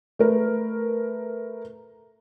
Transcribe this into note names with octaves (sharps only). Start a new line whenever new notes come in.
A3 A#4 B4